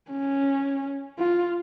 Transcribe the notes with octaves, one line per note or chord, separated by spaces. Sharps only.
C#4
F4